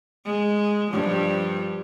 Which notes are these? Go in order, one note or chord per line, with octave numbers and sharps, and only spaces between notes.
G#3
G2 F3